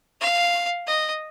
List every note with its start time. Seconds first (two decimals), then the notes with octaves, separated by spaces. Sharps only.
0.21 F5
0.87 D#5